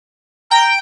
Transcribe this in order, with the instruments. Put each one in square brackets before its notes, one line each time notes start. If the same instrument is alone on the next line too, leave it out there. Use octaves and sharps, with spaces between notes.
[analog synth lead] G5 [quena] A#5